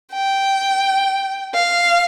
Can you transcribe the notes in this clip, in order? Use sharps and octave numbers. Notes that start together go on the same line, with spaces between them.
G5
F5